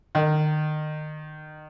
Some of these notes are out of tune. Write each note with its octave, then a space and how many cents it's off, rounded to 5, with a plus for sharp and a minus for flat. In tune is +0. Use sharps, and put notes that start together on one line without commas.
D#3 -30